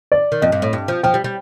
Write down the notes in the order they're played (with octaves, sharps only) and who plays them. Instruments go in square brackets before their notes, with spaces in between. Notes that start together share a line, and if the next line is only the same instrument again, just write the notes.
[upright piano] D5
[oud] D#3
[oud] F2 [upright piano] D#5
[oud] G2
A2
G2
F3
[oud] F3 [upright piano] G5
[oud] G3
G3